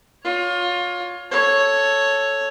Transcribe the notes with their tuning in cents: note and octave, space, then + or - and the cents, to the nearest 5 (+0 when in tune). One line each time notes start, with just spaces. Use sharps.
F4 +25 C#5 +20
A4 +0 C#5 +0